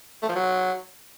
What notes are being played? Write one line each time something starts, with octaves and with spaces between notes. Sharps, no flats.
A3
F3
F#3